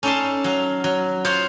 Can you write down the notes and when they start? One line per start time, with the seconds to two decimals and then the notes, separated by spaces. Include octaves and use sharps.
0.03 C#4 D#4 A4 D5 A5 C6
0.44 F#3 F5
0.84 F#3
1.24 F4 C5 C#5 D#5 F5 F#5